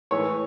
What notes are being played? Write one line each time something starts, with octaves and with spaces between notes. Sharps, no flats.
A2 E3 G#3 C#5